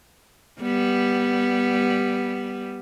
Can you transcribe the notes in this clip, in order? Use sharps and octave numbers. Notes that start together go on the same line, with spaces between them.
G3 B3